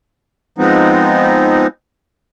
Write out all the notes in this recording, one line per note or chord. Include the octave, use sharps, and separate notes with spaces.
F3 G#3 B3 C4 D#4